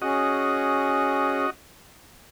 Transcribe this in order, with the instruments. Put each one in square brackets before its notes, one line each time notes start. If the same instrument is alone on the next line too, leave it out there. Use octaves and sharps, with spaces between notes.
[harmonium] C#4 G#4 [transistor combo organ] F#4 D#5